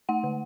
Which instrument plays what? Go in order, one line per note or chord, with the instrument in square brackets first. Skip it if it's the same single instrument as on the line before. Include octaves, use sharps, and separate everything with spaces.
[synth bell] A3 F#5
D3